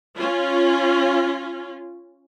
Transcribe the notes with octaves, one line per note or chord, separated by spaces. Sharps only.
C#4 F4